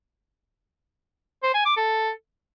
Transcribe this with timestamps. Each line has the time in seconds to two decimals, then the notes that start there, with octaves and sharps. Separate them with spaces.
1.43 C5
1.55 G#5
1.66 D6
1.77 A4